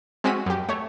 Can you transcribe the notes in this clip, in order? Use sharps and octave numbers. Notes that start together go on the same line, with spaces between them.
G#3 C4 C#4 F#4 B6 D#7
F#2 G4
A3 C#5